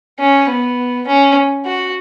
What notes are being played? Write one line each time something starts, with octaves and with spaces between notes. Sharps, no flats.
C#4
B3
C#4
F#4